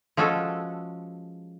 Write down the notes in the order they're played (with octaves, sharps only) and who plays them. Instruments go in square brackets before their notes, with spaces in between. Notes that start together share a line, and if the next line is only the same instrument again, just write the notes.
[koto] F3 G#3 C#4 F#4 A4